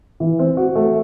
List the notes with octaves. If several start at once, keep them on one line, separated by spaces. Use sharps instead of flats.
E3
C4
F#4
A3